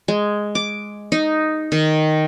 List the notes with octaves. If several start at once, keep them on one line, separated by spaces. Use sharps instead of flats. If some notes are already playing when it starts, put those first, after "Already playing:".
G#3
D6
D#4
D#3